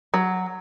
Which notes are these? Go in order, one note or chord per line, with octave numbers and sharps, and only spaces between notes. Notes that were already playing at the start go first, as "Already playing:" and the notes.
F#3